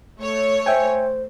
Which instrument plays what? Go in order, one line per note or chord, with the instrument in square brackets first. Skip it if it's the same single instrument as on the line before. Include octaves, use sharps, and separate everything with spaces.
[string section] A3 C#5
[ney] C5 [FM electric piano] E5 G5 G#5